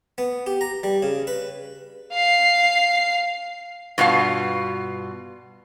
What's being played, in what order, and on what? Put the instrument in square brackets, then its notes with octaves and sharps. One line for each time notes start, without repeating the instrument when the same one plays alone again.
[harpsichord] B3
G4
A#5
G3
C#3
B4
[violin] F5 C7
[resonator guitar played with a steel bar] G2 B2 F4 F5